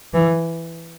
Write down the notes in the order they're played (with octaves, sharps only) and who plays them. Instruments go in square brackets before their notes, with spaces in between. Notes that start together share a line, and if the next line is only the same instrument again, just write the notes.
[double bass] E3